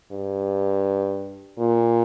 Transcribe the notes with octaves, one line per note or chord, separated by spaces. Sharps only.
G2
A#2